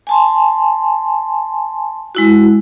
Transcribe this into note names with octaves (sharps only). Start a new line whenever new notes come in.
G#5 A5 C6
G#3 E4 F#4